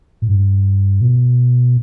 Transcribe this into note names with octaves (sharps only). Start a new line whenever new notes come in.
A2
G2
B2